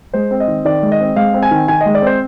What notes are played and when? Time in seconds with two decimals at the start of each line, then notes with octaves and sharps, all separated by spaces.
0.14 G#3 C5
0.31 C4
0.40 D#5
0.48 D#3
0.65 D#3 D5
0.83 G#3
0.92 D#5
1.00 C4
1.16 G#3 F5
1.34 C4
1.43 G#5
1.51 D#3
1.68 D#3 G#5
1.81 G#3 D#5
1.95 D5
2.02 C4 C5